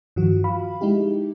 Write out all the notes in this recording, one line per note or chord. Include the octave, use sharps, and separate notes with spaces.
G2 D#3 F3 F#4
F3 F5 B5
G#3 D#4 E4 G4